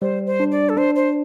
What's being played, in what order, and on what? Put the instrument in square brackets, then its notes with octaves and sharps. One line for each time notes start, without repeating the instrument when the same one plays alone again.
[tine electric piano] G3 [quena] C5
[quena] C5
[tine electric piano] D4
[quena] D5
A4
[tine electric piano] D4 [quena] C5
[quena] C5